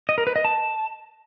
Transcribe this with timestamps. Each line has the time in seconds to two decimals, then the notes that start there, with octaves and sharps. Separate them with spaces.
0.09 D#5
0.18 A#4
0.27 B4
0.36 D#5
0.45 A5